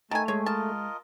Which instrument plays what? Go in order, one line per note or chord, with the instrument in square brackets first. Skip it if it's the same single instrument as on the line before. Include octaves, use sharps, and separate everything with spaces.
[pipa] D#3 G#5 [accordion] A3 [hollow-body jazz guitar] A5
[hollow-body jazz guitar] G#3 G#4 [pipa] C#5
[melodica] F4 A#4 D#5 [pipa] A5